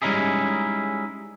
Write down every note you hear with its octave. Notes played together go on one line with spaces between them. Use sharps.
G3 G#3 C#4 D#4 E4 G#4